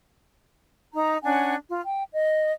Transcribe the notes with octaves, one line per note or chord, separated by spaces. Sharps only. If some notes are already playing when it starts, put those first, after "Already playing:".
D#4 A#5
C#4 D4 F#5 G#5
F4
G5
D#5